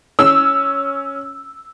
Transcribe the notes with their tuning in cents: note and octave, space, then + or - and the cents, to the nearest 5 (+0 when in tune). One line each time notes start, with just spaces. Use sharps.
C#4 +0 E6 +0